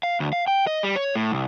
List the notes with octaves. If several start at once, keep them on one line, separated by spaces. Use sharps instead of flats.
F5
D2
F5
G5
D#5
G3
C#5
A2
C2